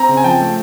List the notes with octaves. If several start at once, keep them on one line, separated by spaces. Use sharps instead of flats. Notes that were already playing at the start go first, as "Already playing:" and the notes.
Already playing: C4 A#5
C#3
G#5
F3 G5 A5
A3